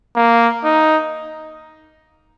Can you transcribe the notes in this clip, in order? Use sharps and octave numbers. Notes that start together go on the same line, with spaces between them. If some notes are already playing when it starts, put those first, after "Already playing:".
A#3
D#4